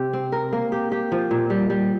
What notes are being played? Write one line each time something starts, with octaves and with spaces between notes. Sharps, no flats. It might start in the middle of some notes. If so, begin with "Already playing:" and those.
Already playing: C3 G4
C4
A#4
A#3
G4
G4
F3
A#2
G3
G3